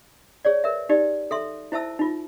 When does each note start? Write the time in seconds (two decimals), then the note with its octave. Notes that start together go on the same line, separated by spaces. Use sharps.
0.45 G#4 C#5 D5
0.64 A#4 B4 E5
0.89 D#4 G4 D5
1.31 A4 E5 C6
1.72 E4 C5 E5 A5 E6
1.99 D#4 F4